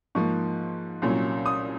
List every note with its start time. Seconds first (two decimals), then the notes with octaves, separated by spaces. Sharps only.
0.15 G#2 F3 A#3 C#6
1.02 C2 A#2 F#3 C#4
1.46 D#6